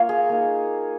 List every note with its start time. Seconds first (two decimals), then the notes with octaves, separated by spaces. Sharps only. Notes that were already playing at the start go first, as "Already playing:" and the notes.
Already playing: A#3 F4 C#5
0.09 G#4
0.29 A#3 D#4